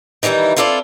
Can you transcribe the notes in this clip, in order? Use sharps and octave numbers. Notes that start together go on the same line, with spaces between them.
D#3 E3 G3 D#4 E4
C4 E4 F4 A4 C#5 D5